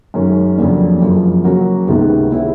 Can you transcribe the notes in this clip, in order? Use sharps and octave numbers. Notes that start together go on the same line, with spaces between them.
F#2 D#3 G#3 C#4
F2 C#3 F#3 A#3 D4
F#2 C#3 F3
F#3 A#3 C#4 F#4
C#2 C3 D#3 G#3 B3
G#3 C#4 E4 G4